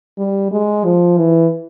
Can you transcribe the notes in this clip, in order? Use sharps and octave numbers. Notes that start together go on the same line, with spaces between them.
G3
G#3
F3
E3